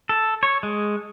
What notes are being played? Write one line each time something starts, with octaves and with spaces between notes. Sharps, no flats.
A4
C#5
G#3